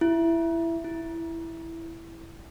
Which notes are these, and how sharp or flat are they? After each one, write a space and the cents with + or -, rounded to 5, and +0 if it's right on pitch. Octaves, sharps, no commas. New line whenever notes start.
E4 +10
E4 +0